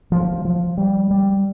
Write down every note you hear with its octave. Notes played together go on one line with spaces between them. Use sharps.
F3
F3
G3
G3